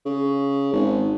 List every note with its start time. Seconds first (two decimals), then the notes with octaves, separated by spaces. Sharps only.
0.05 C#3
0.73 G#1